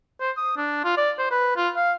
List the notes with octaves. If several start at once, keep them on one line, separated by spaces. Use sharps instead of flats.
C5
D#6
D4
F4
D5
C5
B4
F4
F5